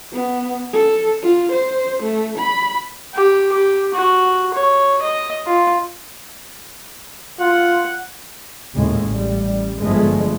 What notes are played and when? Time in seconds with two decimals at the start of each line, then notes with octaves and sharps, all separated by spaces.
0.13 B3
0.74 A4
1.23 F4
1.52 C5
2.03 A3
2.38 B5
3.14 G4
3.52 G4
3.94 F#4
4.54 C#5
5.02 D#5
5.47 F4
7.40 F4 F#5
8.75 D#2 A2 C#3 G#3
9.07 A1 G3
9.81 G1 G2 F3 G#3 A3 B3